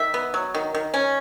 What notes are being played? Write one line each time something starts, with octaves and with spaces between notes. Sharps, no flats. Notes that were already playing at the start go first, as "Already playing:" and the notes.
Already playing: D#3 E5
B3
F#3
D#3
D#3
C#4